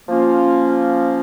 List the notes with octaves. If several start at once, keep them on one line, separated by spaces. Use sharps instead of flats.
F3 A#3 C#4 F4